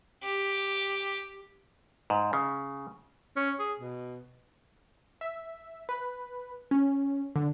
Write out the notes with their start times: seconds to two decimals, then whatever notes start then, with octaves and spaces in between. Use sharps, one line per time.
0.23 G4
2.10 G#2
2.33 C#3
3.36 C#4
3.59 G#4
3.79 B2
5.21 E5
5.89 B4
6.71 C#4
7.36 D3